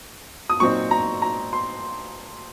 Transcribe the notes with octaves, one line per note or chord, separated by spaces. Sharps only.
D#6
A#2 F#3 C4 D#4 C#6
A#5
A#5
C6